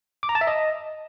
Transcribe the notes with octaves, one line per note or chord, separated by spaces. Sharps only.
D6
A#5
A5
E5
D#5